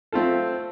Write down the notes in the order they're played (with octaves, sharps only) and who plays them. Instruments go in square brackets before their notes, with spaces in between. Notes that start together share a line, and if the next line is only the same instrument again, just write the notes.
[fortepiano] A3 C4 F4 A4